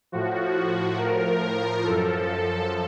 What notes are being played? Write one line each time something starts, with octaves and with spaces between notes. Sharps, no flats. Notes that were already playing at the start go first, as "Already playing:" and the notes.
A2 F3 F#4
A2 F3 A#4
F#2 F3 A4